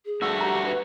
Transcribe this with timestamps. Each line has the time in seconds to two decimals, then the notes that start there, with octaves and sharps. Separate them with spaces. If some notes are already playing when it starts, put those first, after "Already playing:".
0.05 G#4
0.22 G2 A3 F#4 E6
0.41 G4 A#5
0.65 B4